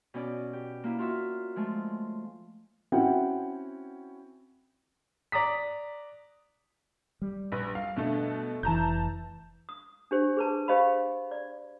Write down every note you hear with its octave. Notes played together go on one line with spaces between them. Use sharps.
B2 C#4 D5
G4
A#3 E4
F4 F#4 E5
F3 G#3 A3
C4 C#4 E4 F#4 F#5 G5
D5 A#5 D#6 B6
G3
A#1 B4
F5
B2 D3 A3
F1 E3 A5 A#5 G6
D#6
D4 G4 C5
G#4 B4 A5
G4 C5 D#5 F5 B5
D5